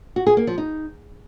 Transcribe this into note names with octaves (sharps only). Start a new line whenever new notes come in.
F#4
G#4
A#3
F3
D#4